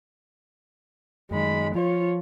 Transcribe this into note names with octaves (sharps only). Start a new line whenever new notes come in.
F#2 D#3 G#3 B5
F3 F4 C#5